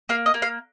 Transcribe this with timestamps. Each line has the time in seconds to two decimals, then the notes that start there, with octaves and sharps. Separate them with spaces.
0.09 A#3 F5
0.26 D#5
0.34 A#3
0.42 F5